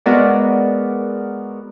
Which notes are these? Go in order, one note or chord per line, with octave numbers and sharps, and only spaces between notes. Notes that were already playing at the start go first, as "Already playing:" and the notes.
G#3 B3 F#4 A#4 D5